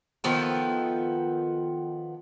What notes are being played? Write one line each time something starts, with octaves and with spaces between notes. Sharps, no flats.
D#3 F3 B3 A4